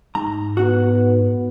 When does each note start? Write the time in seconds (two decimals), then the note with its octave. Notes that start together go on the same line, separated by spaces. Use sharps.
0.15 G#2 A#5
0.57 B3 F#4 F#5